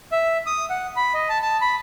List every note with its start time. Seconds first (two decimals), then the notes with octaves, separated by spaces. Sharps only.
0.12 E5
0.46 D#6
0.70 F#5
0.96 B5
1.14 D#5
1.29 A5
1.42 A5
1.61 B5